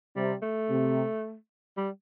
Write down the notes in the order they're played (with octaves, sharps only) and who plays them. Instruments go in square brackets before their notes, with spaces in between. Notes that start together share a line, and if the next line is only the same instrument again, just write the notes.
[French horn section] C3 [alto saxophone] G3
[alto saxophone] A3
[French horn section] C3
[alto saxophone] G3